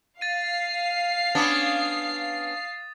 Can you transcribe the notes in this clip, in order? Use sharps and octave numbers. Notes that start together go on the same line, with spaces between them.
F5 A6 C7 D#7
B3 C#4 D4 D#6 A6